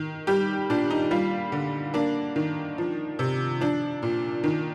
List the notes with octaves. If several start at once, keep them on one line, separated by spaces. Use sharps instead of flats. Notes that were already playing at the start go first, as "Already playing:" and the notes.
Already playing: D#3
G3 G4
A#2 D4
D#4
G3 F4
D3
A#3 D4
D#3
F3
C3
F3 D4
A#2
D#3